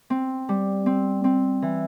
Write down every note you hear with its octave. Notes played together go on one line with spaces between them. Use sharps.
C4
G3
C4
C4
E3